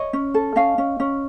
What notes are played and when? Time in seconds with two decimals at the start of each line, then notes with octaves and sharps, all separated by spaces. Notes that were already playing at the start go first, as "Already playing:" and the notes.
Already playing: C#5 D#5
0.13 C#4
0.34 A4
0.56 C#4 D#5 F5
0.78 C#4
1.00 C#4